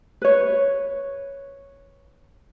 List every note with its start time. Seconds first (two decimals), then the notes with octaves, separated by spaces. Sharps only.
0.22 B4 C#5